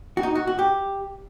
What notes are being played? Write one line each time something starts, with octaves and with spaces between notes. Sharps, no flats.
F#4
D#4
F#4
F#4
G4